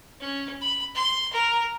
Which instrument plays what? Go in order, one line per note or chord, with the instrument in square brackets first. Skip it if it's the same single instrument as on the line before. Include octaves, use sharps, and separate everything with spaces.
[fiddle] C#4
B5
C6
A#4